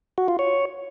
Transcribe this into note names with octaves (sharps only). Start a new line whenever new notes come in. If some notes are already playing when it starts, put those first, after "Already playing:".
F#4
F4
C#5